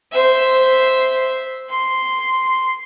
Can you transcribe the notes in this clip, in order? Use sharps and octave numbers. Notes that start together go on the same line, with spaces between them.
C5 E5
C6